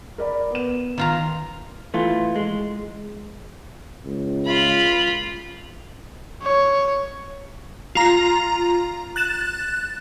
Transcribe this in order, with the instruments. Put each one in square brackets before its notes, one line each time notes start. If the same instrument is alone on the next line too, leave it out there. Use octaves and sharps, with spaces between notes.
[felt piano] A#4 D5 B5
B3 E7
[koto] D#3 F4 A#5
[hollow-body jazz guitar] E3 A3 F4
G#3
[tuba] C#2
[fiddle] F4 B5
[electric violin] C#5
[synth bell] F4 A#5
F#6 A6 E7